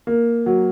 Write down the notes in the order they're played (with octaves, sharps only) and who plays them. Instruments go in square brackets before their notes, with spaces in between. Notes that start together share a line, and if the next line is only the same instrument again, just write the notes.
[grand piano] A#3
F#3